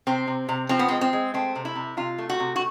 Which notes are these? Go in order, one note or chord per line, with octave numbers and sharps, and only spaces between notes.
C3 C4
C3
C3
F3 C4
B3
G#3 C4
C4
G#3
A3 C4
C3
E4
C3
C3 F4
A3
F#4
C3
F#4